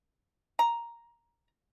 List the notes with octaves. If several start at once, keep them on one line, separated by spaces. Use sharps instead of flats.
A#5